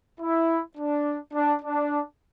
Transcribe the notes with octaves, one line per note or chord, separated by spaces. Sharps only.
E4
D4
D4
D4